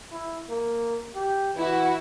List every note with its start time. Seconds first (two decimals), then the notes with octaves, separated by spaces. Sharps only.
0.12 E4
0.49 A#3
1.15 G4
1.56 E3 E4 F#4